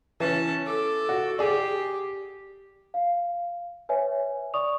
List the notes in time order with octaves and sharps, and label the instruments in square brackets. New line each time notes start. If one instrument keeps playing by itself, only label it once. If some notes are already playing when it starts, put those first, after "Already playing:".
[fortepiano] E3 [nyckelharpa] C#4 A5
[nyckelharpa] A4 D6
[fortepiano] F#4
[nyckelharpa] G4 [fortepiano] G#4 D5
[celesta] F5
B4 C#5 E5 G#5
D5 C#6 D#6 F7